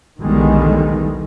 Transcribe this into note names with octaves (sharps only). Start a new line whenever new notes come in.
B1 E2 D3 D#3 G3 G#3